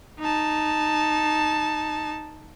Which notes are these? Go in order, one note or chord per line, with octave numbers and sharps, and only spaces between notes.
D#4 A5